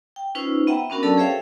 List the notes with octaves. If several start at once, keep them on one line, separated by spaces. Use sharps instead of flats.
G5
C#4 D#4 F4 B4 C5 E6
B3 E5 F#5 G5 A#5
B3 C#4 D4 F#4 A#4
F#3 C#4 A4 D5 A5 E6
G#4 C5 C#5 E5 F5 G5